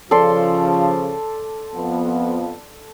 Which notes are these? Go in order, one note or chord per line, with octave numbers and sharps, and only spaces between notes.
C#3 F3 A4 D5 C6
F2 F3 B3